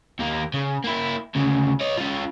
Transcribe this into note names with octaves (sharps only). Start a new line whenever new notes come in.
D#2 A#3
C#3
A#3 E4
D2 C#3
C#5 D#5
C#4 F4